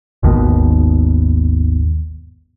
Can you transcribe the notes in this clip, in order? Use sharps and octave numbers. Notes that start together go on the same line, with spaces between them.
G#1 D#2 B2 D#3